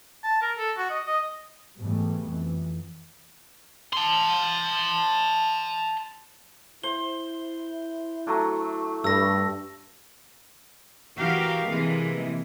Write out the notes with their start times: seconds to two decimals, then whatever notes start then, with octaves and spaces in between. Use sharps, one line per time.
0.24 A5
0.41 A#4
0.58 A4
0.77 F#4
0.90 D#5
1.06 D#5
1.77 G#2 B2 E3 G3 A3
2.24 F2 E3
3.93 A5 C6
6.83 E4 C5 G7
8.27 F#3 A3 D4
9.04 G2 G3 A3 E6 A#6
11.18 E3 F#4 G4 A#4 F5
11.68 C3 E3 G#3 A#3